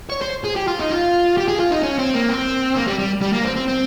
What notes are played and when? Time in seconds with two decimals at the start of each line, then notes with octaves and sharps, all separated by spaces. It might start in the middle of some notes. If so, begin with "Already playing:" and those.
0.10 C#5
0.22 C5
0.45 G#4
0.56 G4
0.68 F4
0.80 D#4
0.91 F4
1.37 G4
1.48 G#4
1.60 F4
1.72 D#4
1.83 C#4
1.99 C4
2.14 A#3
2.29 C4
2.75 A#3
2.87 G3
2.99 G3
3.21 G3
3.33 A#3
3.44 C4
3.56 C4
3.68 C4